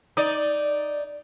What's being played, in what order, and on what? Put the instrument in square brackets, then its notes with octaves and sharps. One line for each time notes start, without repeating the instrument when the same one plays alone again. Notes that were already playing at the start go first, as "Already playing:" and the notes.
[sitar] D#4 D5